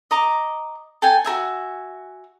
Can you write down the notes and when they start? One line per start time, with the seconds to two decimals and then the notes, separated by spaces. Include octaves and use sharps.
0.11 D#5 A#5 D6
1.02 A4 G5 G#5
1.24 F#4 A#4 E5 G#5